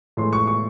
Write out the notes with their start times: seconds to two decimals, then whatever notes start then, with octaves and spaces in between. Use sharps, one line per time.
0.17 A2 E3 G#3 C6
0.33 C#6
0.47 C#6